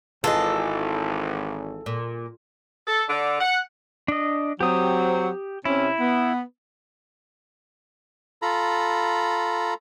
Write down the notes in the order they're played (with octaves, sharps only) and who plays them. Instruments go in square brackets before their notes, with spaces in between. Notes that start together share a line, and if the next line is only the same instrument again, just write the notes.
[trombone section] G#1 [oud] E3 [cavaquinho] F4 G#4 D#5 [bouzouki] A4
[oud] A#2
[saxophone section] A4
D3
F#5
[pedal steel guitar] D4 D#5
[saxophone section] F#3 C4 [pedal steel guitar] G4 D#6
[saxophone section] C3 C#4 [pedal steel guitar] E4
[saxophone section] B3
[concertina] F4 A4 A#5 B5